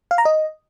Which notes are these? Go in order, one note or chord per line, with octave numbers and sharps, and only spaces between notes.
F5
A#5
D#5